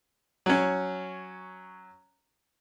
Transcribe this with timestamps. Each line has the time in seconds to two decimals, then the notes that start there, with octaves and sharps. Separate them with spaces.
0.46 F#3 C#4